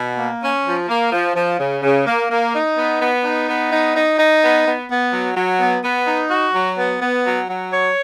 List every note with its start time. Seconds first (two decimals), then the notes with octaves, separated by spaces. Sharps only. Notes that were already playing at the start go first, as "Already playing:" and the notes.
Already playing: B2
0.18 A#3
0.41 C#4
0.65 F3
0.88 A#3
1.12 F3
1.35 F3
1.59 C#3
1.82 C#3
2.06 A#3
2.30 A#3
2.54 D#4
2.76 B3
3.00 B3
3.24 D#4
3.48 B3
3.71 D#4
3.95 D#4
4.18 D#4
4.42 B3
4.65 B3
4.89 B3
5.12 F#3
5.36 F#3
5.60 B3
5.83 B3
6.07 D#4
6.30 F#4
6.54 F#3
6.78 B3
7.01 B3
7.25 F#3
7.48 F#3
7.72 C#5